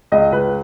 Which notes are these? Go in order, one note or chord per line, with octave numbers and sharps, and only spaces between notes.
C#2 D#5
C#2 B4